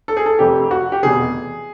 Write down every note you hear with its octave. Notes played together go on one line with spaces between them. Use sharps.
A4
G#4
A4
F1 F2 C3 G4
F#4
G4
F1 E2 B2 G#4